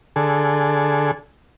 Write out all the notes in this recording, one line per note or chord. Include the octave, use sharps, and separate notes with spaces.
D3 G#4 A4